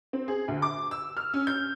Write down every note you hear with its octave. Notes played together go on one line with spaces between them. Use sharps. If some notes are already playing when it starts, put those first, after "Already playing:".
C4
G#4
D2
D6
E6
F6
C#4
G6